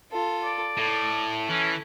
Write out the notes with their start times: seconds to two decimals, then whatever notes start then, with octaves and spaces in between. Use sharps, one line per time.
0.11 F4 A4
0.45 D5
0.77 A2 A4
1.50 E3 C#4